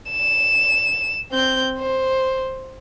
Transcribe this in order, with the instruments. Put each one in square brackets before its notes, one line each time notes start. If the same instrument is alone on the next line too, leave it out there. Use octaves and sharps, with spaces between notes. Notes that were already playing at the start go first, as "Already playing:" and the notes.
[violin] E7
C4 G6
C5